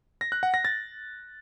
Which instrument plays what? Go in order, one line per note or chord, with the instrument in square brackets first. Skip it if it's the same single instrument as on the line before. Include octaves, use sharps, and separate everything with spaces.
[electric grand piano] A#6
F#6
F#5
A#6
A6